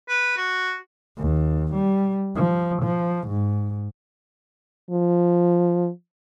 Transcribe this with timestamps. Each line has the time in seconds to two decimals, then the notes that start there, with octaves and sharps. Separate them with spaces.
0.09 B4
0.37 F#4
1.17 D#2
1.74 G3
2.35 F3
2.82 F3
3.28 G#2
4.91 F3